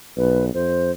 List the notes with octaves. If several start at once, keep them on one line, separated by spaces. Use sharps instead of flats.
B1 B4
F2 C5